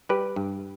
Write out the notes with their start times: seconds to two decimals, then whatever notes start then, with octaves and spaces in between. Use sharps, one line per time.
0.09 G3 G4 B4
0.36 G2